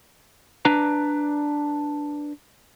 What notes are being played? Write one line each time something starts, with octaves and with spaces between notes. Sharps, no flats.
D4 B4 A#5